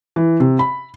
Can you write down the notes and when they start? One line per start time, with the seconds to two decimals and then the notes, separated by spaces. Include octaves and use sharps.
0.16 E3
0.40 C3
0.59 B5